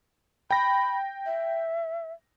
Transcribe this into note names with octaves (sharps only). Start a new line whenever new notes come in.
G5 B5 A#6
E5